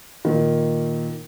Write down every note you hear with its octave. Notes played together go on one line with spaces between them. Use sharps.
A#2 D#3